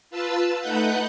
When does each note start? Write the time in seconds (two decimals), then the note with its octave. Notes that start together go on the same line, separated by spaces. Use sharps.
0.10 F4 B4 A5 E6
0.60 A3 D#4 B4 F#5 F#6 G6